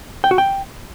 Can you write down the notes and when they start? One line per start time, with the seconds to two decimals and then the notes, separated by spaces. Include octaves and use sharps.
0.24 G5
0.31 F#4
0.38 G5